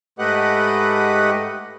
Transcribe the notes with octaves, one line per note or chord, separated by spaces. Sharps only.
G#2 A3 G4 B4 D#5 F#5